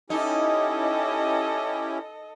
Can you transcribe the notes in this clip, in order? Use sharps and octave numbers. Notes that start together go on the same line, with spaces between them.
C#4 D#4 E4 G4 A4 D#5